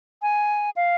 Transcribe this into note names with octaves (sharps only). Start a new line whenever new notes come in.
G#5
F5